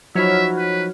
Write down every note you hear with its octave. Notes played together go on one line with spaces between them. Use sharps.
F3 F#3 D#4 F#4 C#5 E5 B5 F6
B4